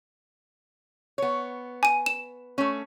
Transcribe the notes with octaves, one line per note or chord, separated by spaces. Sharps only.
B3 C#5
G#5 D#7
E7
A3 C#4